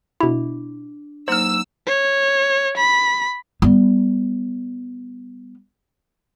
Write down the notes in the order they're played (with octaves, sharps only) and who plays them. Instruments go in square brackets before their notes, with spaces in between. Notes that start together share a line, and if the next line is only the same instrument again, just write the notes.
[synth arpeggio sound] B2 E4 [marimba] D4
[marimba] F#3 A#3 D#4 [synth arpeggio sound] C5 F6 [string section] E6
[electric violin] C#5
B5
[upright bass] G3 B3